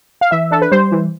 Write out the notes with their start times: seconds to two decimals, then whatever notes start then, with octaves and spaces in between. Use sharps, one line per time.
0.21 F5
0.31 E3 E5
0.51 D4 A4
0.62 B4
0.72 G3 C5
0.92 E3